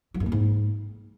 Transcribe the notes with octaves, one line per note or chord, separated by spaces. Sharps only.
F#3
G2
A#3
G#2